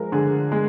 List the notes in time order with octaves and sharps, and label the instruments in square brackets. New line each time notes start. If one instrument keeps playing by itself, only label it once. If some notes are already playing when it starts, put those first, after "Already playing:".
Already playing: [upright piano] F3 G#3 A#4
D3 G#4
G#3